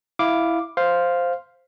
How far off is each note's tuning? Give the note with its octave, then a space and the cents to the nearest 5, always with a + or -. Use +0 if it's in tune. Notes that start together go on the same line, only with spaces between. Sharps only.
E4 +0 F5 +0 D6 +0
C5 +0 F5 +0